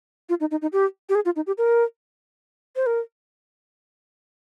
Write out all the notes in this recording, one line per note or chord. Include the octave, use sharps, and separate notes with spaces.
F4
D#4
D#4
D#4
G4
G4
G#4
F4
D#4
G4
A#4
C5
A#4